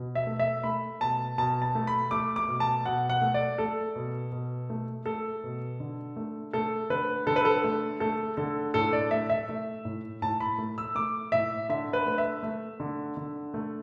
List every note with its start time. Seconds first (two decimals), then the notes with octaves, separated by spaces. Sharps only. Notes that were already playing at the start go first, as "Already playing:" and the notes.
Already playing: B2
0.15 E5
0.27 A3
0.39 E5
0.64 A3 B5
1.00 B2 A5
1.38 B2 A5
1.62 A5
1.75 A3
1.87 B5
2.11 A3 D6
2.36 D6
2.48 B2
2.60 A5
2.85 B2 F#5
3.10 F#5
3.22 A3
3.34 D5
3.58 A3 A4
3.96 B2
4.32 B2
4.70 A3
5.06 A3 A4
5.44 B2
5.80 D3
6.16 A3
6.53 A3 A4
6.90 D3 B4
7.27 D3 A4
7.36 B4
7.45 A4
7.64 A3
8.00 A3 A4
8.37 D3 A4
8.74 A2 A4
8.93 D5
9.11 A3 E5
9.30 E5
9.49 A3
9.85 A2
10.22 A2 A5
10.40 B5
10.58 A3
10.78 E6
10.95 A3 D6
11.32 A2 E5
11.69 D3 E5
11.93 B4
12.06 A3
12.18 E5
12.43 A3
12.80 D3
13.17 D3
13.54 A3